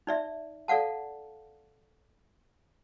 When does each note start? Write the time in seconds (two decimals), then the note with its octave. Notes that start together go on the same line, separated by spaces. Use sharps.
0.07 D#4 D5 E5
0.68 A4 D5 F5 F#5 A5